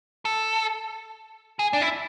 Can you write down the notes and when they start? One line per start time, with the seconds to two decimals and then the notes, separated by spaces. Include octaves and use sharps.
0.25 A4
1.59 G#4
1.73 D4
1.81 E4